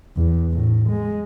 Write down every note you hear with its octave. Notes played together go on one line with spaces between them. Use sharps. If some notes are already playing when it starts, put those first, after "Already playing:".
E2
A2
G#3